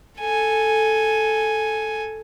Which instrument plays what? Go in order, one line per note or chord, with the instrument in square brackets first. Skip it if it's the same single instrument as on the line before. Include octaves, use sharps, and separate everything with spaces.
[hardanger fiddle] A4 G#5